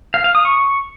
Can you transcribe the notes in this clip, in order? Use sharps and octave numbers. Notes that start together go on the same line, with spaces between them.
F5
F5
D#6
C#6